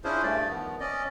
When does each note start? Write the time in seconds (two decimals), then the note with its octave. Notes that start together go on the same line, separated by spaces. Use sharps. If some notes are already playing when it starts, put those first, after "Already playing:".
0.04 C#4 D4 E4 F4 G#4 C5
0.23 G2 A3 D5
0.49 D#3 F3 B3
0.80 C#4 D5 D#5